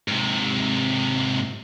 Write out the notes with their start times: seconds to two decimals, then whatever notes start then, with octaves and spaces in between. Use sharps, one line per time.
0.08 G#2 C3